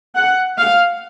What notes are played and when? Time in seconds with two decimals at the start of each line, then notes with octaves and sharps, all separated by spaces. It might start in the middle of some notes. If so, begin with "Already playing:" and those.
0.17 F#5
0.58 F5